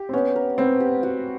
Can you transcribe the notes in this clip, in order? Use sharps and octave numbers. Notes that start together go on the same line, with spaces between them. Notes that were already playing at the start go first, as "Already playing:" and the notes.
Already playing: G4
C4
B3 C#4
A#4
B3 C4
G4
F#4